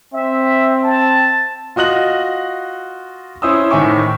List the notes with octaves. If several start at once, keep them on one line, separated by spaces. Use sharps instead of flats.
C4 E5
A5
F4 F#4 D#5 F#6 F#7
C#4 E4 C5 D#6 E6
A2 D#3 E5 G#5 C#6 D6